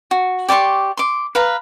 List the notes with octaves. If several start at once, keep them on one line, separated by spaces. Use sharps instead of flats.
F#4
G4 D5 C6 C#6
C6 D6
B4 F5 A#5